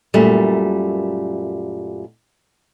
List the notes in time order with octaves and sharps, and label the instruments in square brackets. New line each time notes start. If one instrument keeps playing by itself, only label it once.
[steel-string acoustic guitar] F#2 A#2 G3 A3